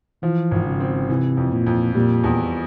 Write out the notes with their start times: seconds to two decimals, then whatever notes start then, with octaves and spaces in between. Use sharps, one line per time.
0.23 E3 F3
0.51 G#1
0.66 C#3
0.80 C4
1.09 C3 E3
1.37 F2
1.52 A#2
1.67 F2
1.95 A#2 G3
2.24 E2